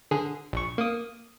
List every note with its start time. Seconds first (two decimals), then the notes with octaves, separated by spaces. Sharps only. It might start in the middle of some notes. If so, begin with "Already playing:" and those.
0.11 D3 G#4
0.53 A#1 C#6
0.78 A#3 D#6